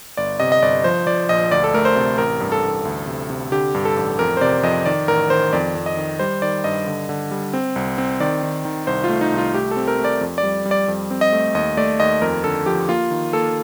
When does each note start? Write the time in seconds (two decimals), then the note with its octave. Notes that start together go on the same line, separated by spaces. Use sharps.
0.17 G1 D5
0.40 C3 D#5
0.52 D#5
0.62 G1 D5
0.84 F3 C5
1.07 F3 D5
1.29 A#1 D#5
1.51 D2 D5
1.64 A4
1.74 A3 A#4
1.85 C5
1.96 C3
2.18 A1 A#4
2.40 G2
2.52 A4
2.63 A1
2.85 D2
3.07 C3
3.30 C3
3.52 D3 G4
3.75 G2
3.85 A4
3.97 A1
4.19 F2 A#4
4.37 C5
4.41 C3 D5
4.63 F2 D#5
4.86 D#3 D5
5.08 A1 A#4
5.30 D#3 C5
5.53 F2 D5
5.75 F2
5.86 D#5
5.97 D#3
6.19 G3 C5
6.42 D#3 D5
6.64 G2 D#5
6.87 D3
7.09 D3
7.31 G3
7.53 C4
7.76 C2
7.98 C4
8.20 D#3 D5
8.43 D#3
8.65 D#3
8.87 C2 C5
9.04 F4
9.09 A3
9.21 D#4
9.32 C2
9.38 F4
9.54 A3 G4
9.71 A4
9.76 C4
9.88 A#4
9.99 A3
10.05 D5
10.21 F2
10.38 D5
10.43 G3
10.66 G3
10.71 D5
10.88 F2
11.11 C4
11.21 D#5
11.32 A3
11.55 D#2 D#5
11.77 A3 D5
12.00 D#2 D#5
12.22 F2 A#4
12.44 D3 A4
12.66 F3 G4
12.89 A#3 F4
13.11 D#3
13.33 A#3 A4